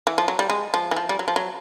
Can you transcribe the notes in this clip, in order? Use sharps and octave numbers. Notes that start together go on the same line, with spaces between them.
E3
F3
F#3
G3
G#3
F3
E3
F3
G3
F#3
F3
F#3